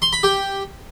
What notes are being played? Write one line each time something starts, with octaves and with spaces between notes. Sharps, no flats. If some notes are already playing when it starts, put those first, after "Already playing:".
C6
B5
G4